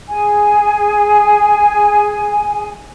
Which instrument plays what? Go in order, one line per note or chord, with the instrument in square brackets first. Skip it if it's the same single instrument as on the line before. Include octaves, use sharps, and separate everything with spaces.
[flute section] G#4 G#5